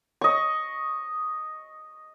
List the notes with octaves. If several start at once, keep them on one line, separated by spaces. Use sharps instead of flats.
D#5 C#6